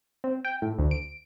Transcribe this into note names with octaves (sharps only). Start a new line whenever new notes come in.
C4
G5
A2
D2
D7